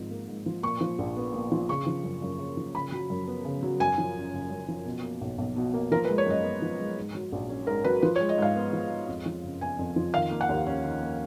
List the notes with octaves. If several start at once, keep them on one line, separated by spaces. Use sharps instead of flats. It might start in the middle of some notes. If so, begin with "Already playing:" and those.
Already playing: G#1 G#2 F3
A#3
G#2
F3
A#2 C#6
F3
A#1
B3
A#2
F3
C#3 C#6
F3
F#2
F#2
C#3
F3
C#3 B5
F#3
F#2
B3
C#3
F#3
F#2 G#5
F3
F#1
F#1
F#2
F3
B2
A#3
B1
B1
B2
A#3
F3 A#4
B4
G#3
C#5
F#2 D#5
B3
F3
G#3
G#2
F#3
A#1
C#4
G#2 A#4
F#3 B4
F3 B4
C#5
G#3
D#5
G#2 F5
B3
F3
G#3
F2
F3
F#1
B3 G#5
F2
F3
D#3 F5
A#3
F#5
D#2
C#4
D#3
A#3